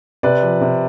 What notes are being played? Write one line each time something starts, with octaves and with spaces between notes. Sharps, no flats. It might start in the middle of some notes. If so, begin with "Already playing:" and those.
C3 B4 D5
F3
C3